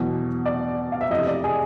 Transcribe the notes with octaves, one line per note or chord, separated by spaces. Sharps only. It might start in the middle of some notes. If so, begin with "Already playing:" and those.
Already playing: E2 B2 F#3
D5
F5
E5
F2 C3 E3 D#5
D5
G#4